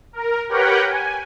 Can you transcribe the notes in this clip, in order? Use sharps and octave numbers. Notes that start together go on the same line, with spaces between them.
A#4
G4 A#4 B4 C#5 F#5 G5
G#5